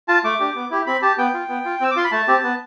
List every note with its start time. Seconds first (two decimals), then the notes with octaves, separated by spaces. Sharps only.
0.08 F4 A5
0.24 A3 D6
0.40 D4 G4
0.55 B3
0.71 E4 G4
0.87 C4 B5
1.02 G4 A5
1.18 B3 G5
1.34 F4
1.49 B3
1.65 F4
1.80 C4 E6
1.91 D6
1.96 F4 C6
2.04 B5
2.12 A3 A5
2.28 C4 G4
2.43 B3